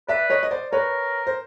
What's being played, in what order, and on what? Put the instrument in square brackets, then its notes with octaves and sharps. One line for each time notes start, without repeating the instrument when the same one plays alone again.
[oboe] B4 [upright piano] D5 E5
[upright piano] C#5 D#5
D#5
C5 D5
[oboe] A#4 [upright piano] B4 C#5
[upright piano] C5